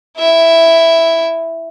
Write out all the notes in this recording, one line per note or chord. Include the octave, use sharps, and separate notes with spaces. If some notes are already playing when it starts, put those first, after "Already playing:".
E4 E5